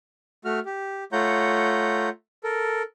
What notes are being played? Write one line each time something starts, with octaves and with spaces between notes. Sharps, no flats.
A3 F#4 F6
G4
A3 F4 C#5 F#5 A#5 G6
A4 A#4